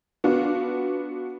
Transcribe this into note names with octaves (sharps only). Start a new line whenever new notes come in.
B3 D4 F4 F#4